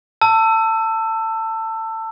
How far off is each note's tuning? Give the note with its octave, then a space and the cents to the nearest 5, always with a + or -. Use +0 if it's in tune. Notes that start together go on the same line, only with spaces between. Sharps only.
A5 +25 E6 +10